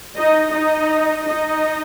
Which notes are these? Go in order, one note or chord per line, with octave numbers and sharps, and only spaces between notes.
D#4 D#5
D#4 D#5
D#4 D#5